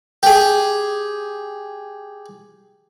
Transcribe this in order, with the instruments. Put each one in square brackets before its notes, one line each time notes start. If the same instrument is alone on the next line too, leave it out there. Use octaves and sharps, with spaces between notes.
[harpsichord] G4 G#4